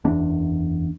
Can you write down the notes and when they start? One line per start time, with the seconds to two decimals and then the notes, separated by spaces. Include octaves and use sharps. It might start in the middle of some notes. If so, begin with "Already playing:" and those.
0.04 F#1 E2 D4